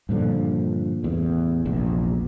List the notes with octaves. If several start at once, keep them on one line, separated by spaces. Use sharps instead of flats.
G2 A#2 D3 F3
A1 E2
F1 A#1 E2